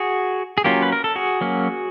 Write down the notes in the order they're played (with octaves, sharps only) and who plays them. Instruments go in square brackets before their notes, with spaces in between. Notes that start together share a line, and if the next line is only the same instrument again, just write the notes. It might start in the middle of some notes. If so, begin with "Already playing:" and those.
Already playing: [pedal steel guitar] F#4 G#4
G#4
F#3 A#3 C#4 F4 G4
B4
A#4
A4
F#4 G#4
F#3 A#3 C#4